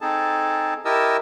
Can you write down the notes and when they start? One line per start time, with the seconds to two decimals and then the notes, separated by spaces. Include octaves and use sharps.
0.01 C4 D#4 G#4 A4 A5
0.85 E4 G4 A#4 D#5 A5 E6